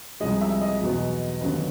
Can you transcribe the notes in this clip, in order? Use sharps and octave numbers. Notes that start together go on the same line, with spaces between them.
C2 C3 F3 G#3 D#5
E5
D#5
E2 B2 F#3 B3
D#2 D3 F#3 B3